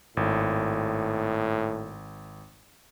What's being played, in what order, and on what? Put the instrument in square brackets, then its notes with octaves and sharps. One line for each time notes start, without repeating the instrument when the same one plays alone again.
[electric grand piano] G#1 [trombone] A2